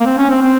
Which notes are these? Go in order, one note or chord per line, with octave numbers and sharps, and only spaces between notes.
A#3
C4
C#4
C4
C4